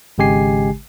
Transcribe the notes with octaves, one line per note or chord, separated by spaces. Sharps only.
G#1 C#3 G#3 G4 G#5 C7